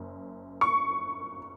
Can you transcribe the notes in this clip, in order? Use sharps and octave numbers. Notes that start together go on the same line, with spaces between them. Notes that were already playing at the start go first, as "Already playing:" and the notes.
Already playing: F#1 F#2
C#6